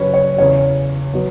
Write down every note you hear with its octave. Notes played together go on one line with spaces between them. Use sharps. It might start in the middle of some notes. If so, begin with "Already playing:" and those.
Already playing: F#2 C#3 F#3 C#4 B4 C#5
C#5
E2 C#3 E3 C#5
F#3 B3